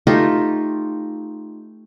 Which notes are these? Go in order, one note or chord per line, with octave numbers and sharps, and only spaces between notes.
A3 D#4 F4 G4